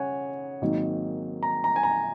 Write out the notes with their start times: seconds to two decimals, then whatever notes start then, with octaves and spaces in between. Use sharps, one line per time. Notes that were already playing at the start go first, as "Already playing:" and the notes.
Already playing: C#3 C#5 F#5 G#5
0.62 G#1 G#2 D#3 F#3 A#3
1.43 A#5
1.64 A#5
1.76 G#5
1.83 A#5